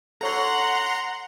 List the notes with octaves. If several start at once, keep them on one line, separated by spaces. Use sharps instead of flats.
A4 C#5 F#5 A#5 C6